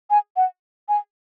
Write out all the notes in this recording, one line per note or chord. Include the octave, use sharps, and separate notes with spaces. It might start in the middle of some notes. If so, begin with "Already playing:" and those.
G#5
F#5
G#5